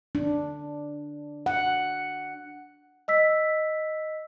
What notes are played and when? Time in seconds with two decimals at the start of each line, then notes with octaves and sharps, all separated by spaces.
0.15 D4
1.46 F#5
3.08 D#5 E6 B6